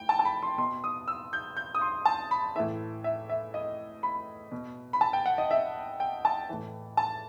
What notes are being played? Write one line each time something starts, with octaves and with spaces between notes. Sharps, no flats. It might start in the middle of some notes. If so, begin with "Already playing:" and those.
Already playing: A2 G5
A5
A5
B5
C6
B2 C6
D#6
E6
G6
G6
D#6
C6
A5
B5
A2 E3 E5
E5
E5
D#5
B5
B2
B5
A5
G5
F#5
D#5
E5
G5
A5
A2 E3
A5